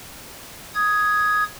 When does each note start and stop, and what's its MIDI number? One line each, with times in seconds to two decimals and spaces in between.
0.74 1.43 87
0.74 1.43 92